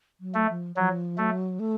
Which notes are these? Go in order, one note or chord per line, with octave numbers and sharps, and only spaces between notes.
F#3
A3
F3
F3 F#3
F#3 A3
A3